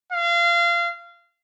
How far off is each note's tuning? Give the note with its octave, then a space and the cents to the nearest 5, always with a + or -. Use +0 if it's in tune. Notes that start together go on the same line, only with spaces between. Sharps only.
F5 -25